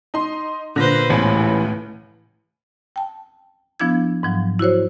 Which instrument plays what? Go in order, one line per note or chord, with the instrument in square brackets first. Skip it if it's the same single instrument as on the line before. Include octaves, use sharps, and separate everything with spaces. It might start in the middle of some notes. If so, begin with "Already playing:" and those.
[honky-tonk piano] D#4 C6
[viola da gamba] A#2 B4 C5 [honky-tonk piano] D3 A#6
[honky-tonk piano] C#2 B3 B5 [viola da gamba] A2 [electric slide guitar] E3 E4 C#5
[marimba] G5 A5
F3 B3 D4 E4 G#6
G#2 F3 F#3
E4 F#4 C5 C#5